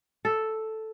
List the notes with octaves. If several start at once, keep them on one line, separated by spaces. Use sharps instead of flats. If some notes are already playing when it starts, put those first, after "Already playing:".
A4